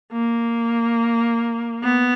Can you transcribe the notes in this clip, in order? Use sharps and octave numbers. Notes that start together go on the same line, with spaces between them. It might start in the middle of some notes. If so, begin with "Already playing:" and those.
A#3
B3